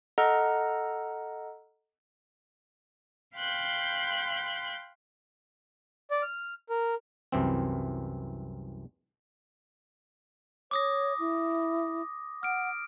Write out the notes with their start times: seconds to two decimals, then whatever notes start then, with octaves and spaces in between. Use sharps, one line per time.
0.18 A4 D#5 F#5 A#5 F6
3.36 F5 G5 B5 C6 F#6 G6
6.11 D5
6.22 F6
6.69 A#4
7.32 C2 F#2 E3 C4
10.71 C#5 D6 D#6 A#6
11.19 E4
12.43 F#5 F6 D7